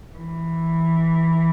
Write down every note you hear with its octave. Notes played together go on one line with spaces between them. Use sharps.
E3